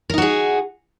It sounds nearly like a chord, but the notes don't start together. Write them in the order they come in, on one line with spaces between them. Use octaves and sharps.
A#4 D#4 F#4 G#4